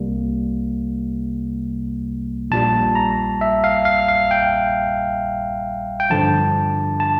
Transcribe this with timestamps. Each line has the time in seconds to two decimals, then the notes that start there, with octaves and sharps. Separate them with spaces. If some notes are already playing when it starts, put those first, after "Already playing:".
Already playing: C2 C3 G3 A#3
2.50 A#1 A#2 G3 A5
2.95 A#5
3.41 E5
3.64 F5
3.85 F5
4.09 F5
4.31 G5
6.00 G5
6.10 G2 D3 F3 A5
7.00 A5